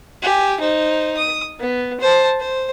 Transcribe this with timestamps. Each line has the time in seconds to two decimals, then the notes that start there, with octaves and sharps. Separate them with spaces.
0.22 G4 G#5
0.60 D#4 C5
1.17 D#6
1.60 B3
2.01 C5 A5
2.40 C5